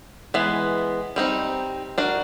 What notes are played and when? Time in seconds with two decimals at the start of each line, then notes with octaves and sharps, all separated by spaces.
0.34 E3 G#3 B3
1.16 G3 C4 D#4
1.98 D4 F#4 A#4